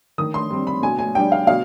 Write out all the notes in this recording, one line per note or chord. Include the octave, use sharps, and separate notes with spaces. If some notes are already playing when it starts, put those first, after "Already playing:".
D#3 D#6
C6
G3 C4
B5
B2 G#5
G#5
G3 D4 G5
F5
B2 F5